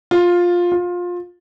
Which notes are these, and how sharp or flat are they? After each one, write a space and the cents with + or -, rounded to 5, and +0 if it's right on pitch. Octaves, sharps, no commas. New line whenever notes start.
F4 +10
F4 +20